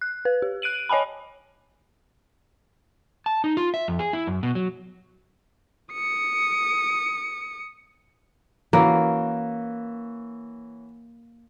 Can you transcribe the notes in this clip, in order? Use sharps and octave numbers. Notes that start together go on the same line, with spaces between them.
F#6
B4
G4
F#6 D7 D#7 F#7
C#5 D#5 G#5 A5 B5
A5
D#4
F4
E5
F2
G#4
E4
F#2
B2
F#3
D#6 C#7
E3 A#3 C#4 F#4